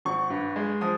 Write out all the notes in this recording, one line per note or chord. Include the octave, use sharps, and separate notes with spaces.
G#1 C#6
G2
G#3
F3 D#6